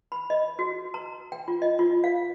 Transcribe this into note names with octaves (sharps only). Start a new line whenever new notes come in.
B5
D#5
F#4
A#5
G5
F4
D#5
F4
F5